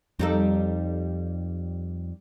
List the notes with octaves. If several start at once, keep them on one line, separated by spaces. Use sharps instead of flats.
F2 G3 D#4 A4